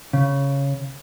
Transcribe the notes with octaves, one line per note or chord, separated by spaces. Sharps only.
C#3